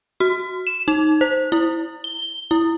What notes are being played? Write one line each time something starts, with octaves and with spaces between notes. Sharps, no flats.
F#4
E7
D#4
C5
E4
G7
E4